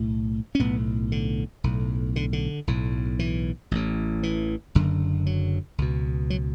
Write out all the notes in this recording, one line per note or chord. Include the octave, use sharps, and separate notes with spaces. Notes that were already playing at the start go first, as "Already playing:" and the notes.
Already playing: B1 A2
C#4
B1 A2 B3
D3
B1 A2
D3
D3
B1 A2
E3
A1 A2
E3
F#1 F#2 D3
F#3
C#2 B2
F#3